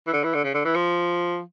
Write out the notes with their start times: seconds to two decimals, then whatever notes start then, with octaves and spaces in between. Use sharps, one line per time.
0.07 E3
0.13 D3
0.24 E3
0.34 D3
0.44 C#3
0.54 D3
0.65 E3
0.75 F3